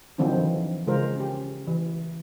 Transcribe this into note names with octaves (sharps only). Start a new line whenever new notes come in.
D3 D#3 F3 F#3 C4 D4
E3
C#3 G#3 F4 A#4 C5
C#4 G4
E3